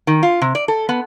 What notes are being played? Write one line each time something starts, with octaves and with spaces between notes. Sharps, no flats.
D#3
F4
C3
D5
A4
B3